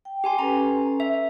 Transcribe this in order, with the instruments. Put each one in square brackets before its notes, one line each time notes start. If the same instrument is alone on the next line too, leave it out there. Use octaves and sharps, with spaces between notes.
[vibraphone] G5
[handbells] G4 G#5 C6
[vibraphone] C#4 A4 B4 [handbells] A#5
[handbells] E5